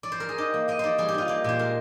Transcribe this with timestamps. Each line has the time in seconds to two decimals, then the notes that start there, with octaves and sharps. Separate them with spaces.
0.03 D5
0.12 C5
0.20 A#4
0.29 G#4
0.38 D#4 G4
0.54 A#3
0.68 A#3 D#5
0.79 D#4 C5 D5
0.98 G3 G#4
1.09 G4
1.14 D#4 F4
1.28 A#3 G4
1.44 A#2 C5
1.59 G#3 A#4